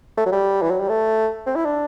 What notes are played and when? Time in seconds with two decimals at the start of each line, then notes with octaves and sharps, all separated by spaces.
0.17 A3
0.26 F#3
0.32 G3
0.62 E3
0.70 F#3
0.80 G3
0.89 A3
1.46 C4
1.55 E4
1.65 D4